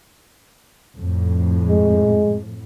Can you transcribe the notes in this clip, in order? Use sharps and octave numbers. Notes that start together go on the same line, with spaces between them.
F2 A2
G#3